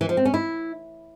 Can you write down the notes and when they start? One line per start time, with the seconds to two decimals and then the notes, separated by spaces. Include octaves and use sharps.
0.01 E3
0.09 F3
0.17 C4
0.25 C#4
0.34 E4